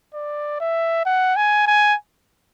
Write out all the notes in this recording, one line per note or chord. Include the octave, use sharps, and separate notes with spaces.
D5
E5
F#5
G#5
G#5